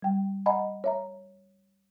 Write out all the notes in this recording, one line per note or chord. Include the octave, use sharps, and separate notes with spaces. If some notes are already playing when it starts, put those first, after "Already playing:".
G3 G5
D#5 F#5 G#5 A#5 B5
C#5 E5 A#5